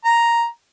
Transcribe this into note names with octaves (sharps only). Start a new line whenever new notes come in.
A#5